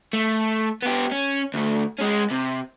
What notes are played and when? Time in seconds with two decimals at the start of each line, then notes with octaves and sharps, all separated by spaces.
0.13 A3
0.83 B3 G4
1.12 C#4
1.54 D2 A3
1.99 G#3 C#4
2.31 C3